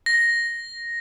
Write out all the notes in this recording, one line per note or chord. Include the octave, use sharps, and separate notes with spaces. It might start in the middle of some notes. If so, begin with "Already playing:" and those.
A#6